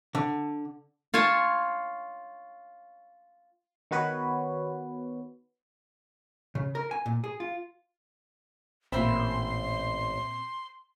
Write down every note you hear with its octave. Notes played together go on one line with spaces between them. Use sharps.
D3
F4 C#5 G#5 A5
D#3 B3 F#4 B4 C#5
C#3
A#4
G#5
A#2
G#4
F4
A1 A#2 C4 C5 E5 B5 C6